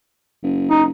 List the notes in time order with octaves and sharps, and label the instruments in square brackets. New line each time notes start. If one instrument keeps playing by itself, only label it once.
[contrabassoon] F#1
[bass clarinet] D#4